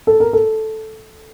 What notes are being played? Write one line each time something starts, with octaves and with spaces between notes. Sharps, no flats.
A4
A#4
A4